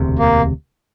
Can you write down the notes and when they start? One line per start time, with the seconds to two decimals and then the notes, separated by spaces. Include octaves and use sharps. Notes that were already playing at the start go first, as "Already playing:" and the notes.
Already playing: E1 D2 C3
0.19 A#3